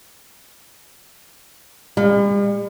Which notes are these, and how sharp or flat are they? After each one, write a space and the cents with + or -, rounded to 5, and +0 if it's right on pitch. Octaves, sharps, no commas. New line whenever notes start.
G3 +45